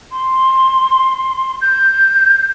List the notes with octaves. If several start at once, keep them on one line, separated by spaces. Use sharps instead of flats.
C6
G6